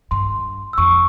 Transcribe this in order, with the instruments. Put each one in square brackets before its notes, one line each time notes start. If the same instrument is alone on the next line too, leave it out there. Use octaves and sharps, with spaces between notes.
[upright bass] G2 [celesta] C6
[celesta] E6
[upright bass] F2 [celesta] C#6